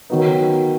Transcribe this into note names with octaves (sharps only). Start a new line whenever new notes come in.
D#3 F#3 B3 D#4